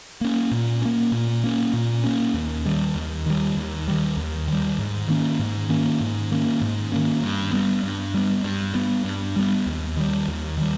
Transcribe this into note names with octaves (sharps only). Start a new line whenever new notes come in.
A#3 C#4
A#2
A#3 C#4
A#2
A#3 C#4
A#2
A#3 C#4
D#2
D#3 G3
D#2
D#3 G3
D#2
D#3 G3
D#2
D#3 G3
G#2
D#3 A#3 C#4
G#2
D#3 A#3 C#4
G#2
D#3 A#3 C#4
G#2
D#3 A#3 C#4
G2
G3 B3
G2
G3 B3
G2
G3 B3
G2
G3 B3
D#2
D#3 G3
D#2
D#3 G3